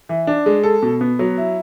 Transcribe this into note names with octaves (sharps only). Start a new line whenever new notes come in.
E3
D4
G#3
A4
B2
B3
F#3
E4